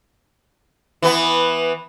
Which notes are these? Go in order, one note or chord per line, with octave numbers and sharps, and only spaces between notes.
E3 B3